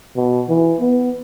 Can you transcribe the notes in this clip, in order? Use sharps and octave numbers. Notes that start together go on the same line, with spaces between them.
B2
E3
B3